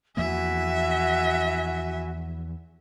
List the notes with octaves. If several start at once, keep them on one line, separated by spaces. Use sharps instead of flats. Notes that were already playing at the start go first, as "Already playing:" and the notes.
E2 F3 A#3 E4 F#4 E5 G#5